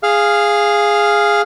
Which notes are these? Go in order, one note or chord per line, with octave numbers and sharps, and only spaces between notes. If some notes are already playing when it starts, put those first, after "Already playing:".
G#4 F5 F6